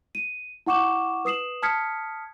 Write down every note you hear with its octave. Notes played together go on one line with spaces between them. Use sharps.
D#7
E4 F#5 C#6 D6 E7
B4 D#6 C7 E7 F#7
A5 D#6 F6 G#6 B6 C#7